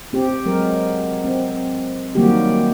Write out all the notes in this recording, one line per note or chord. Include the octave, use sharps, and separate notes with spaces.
C4 G4
F#3 G#3 A#4
C4
D#3 F#3 G3 A#3 F#4 G4